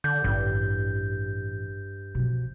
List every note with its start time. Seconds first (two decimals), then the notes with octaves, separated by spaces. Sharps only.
0.04 D3 G6
0.24 A1 G2
2.15 B2 F3